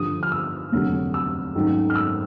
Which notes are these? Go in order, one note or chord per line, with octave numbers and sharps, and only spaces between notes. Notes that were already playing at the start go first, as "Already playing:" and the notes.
Already playing: G2 D3 F3 D#6
F6
E6
F1 D#2 D3 F#3
E6
G#2 D#3 F#3 A3 C#4
F6
E6